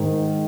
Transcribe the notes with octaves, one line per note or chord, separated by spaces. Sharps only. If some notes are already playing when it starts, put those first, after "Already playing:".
Already playing: G#2 D#3